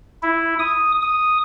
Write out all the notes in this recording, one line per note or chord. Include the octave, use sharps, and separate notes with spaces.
E4
D#6
D#6